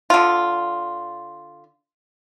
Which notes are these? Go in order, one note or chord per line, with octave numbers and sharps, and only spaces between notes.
D3 F4